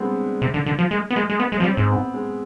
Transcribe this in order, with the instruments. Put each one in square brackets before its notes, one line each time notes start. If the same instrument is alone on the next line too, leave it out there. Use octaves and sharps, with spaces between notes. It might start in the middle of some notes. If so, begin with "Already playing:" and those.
Already playing: [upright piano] G3 G#3 B3 C4 D4
[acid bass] C3
D3
D3
F3
G#3
B3
G#3
G#3
B3
G#3
[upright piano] C4
[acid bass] F3
G3
[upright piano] C4
[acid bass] G#2
[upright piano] B3
G#3